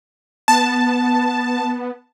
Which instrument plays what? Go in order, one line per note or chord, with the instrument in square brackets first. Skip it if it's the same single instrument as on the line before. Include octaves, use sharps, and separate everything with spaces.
[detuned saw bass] B3 [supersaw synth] A5